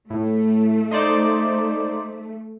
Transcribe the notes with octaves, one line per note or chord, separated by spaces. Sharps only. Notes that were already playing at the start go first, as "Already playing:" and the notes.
A2 A3
D#4 C5 D5